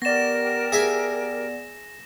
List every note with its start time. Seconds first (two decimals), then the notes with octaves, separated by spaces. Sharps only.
0.02 B3 G4 A#4 D5 A#6 E7
0.72 G#4 E5 G#5